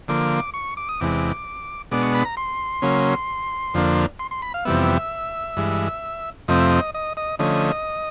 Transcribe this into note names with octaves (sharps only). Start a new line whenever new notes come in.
D3 F3 A#3 D6
C#6
D6
D#6
E2 C3 E3 G#3 D6
B2 G#3 B3 D4 D6
C#6
B5
A#5
C6
C#3 F#3 A#3 C#4
F2 D3 F3 A#3 D4
C6
C6
B5
F5
F2 C3 E3 G3 B3 E5
G2 E3 G#3
F2 C3 F3 A3 C4 D#5
E5
D#5
D#5
D#5
D3 F3 A3 C#4 D#5